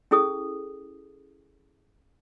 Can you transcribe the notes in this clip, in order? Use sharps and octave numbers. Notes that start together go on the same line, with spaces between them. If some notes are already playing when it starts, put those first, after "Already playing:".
C#4 E4 G#4 A4 D#6